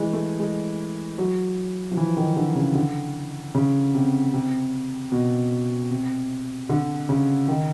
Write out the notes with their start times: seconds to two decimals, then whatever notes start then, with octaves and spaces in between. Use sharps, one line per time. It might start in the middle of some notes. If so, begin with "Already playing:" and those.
Already playing: E3 G#3
0.13 A3
0.40 G#3
1.18 F#3
1.92 F3
1.97 E3
2.17 D#3
2.36 D3
2.56 C#3
2.75 D3
3.55 C#3
3.94 C3
4.33 C3
5.12 B2
5.91 C3
6.69 D3
7.09 C#3
7.48 D#3